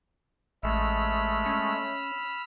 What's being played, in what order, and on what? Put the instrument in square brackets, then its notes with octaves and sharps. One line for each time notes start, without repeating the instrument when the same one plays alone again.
[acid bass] A1 [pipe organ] G#3 A3 [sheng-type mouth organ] B5 E6 F6
[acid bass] C#4